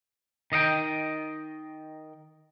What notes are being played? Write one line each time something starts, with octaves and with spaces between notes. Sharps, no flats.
D#3 D#5 F5 G5